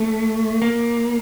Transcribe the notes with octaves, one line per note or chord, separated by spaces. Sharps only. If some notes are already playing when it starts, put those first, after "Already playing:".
Already playing: A3
A#3